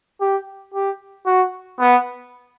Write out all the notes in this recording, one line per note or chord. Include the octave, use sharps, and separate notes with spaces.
G4
G4
F#4
B3